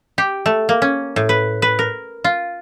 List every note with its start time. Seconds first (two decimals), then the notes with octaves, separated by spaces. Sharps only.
0.18 G4
0.46 A3
0.69 A#3
0.82 C#4
1.16 A2
1.29 B4
1.62 B4
1.79 A#4
2.24 F4